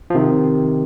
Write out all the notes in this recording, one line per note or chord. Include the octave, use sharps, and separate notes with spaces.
F3
C3 D#3